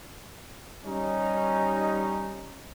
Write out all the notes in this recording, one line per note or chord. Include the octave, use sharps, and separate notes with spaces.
G3 C#4 D#4